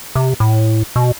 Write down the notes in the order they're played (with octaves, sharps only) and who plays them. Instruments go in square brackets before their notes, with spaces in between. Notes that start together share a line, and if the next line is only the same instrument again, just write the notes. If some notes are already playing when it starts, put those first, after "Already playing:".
[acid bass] C3
A2
B2